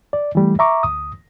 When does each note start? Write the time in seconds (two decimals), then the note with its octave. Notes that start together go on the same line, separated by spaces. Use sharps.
0.13 D5
0.35 E3 G3 A3
0.59 E5 A#5 C#6 D6
0.83 D2 D#6